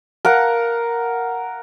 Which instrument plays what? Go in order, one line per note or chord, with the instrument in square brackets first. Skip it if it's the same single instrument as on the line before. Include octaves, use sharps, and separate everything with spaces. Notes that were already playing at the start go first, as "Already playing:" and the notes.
[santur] A#4 F5 F#5